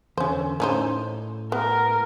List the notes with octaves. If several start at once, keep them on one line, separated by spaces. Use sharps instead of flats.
E2 D3 C#4 C5
A2 C#4 D#4 C5
B3 A#4